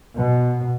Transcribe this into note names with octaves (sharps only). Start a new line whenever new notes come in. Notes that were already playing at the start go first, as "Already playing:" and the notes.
B2